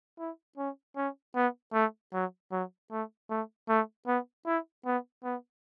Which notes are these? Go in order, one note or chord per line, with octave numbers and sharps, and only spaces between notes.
E4
C#4
C#4
B3
A3
F#3
F#3
A3
A3
A3
B3
E4
B3
B3